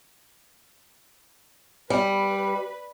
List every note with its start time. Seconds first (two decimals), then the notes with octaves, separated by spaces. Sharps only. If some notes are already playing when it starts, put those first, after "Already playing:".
1.90 G3 B4